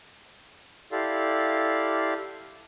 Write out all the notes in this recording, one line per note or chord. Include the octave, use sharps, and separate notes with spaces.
E4 G4 A4 D5 F5 C6